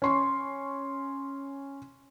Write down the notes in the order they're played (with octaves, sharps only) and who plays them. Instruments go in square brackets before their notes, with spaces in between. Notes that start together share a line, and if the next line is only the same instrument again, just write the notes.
[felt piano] C#4 C6 C#6